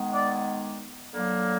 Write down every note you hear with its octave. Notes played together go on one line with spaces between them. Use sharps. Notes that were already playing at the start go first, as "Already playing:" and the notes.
Already playing: D#3 G#3 B3
D5
D3 F#3 A#3